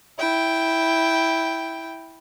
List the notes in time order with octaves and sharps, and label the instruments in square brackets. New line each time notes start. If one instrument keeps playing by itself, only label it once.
[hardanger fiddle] E4 G5